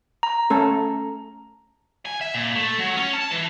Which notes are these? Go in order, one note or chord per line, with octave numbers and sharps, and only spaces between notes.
A#5
A3 C#4 A4
G#5
E5
A#2
A3
F#3
C#4
A5
E3